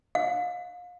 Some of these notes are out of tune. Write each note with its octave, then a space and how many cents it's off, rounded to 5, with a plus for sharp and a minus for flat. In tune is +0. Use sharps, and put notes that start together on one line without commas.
F5 +35